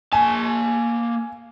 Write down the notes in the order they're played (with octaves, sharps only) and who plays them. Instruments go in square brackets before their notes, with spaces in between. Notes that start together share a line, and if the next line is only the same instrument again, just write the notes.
[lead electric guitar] A#3 A5 [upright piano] G#5